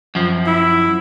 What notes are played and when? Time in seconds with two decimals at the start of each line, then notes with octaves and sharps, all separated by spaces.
0.15 F#2 F3
0.47 E4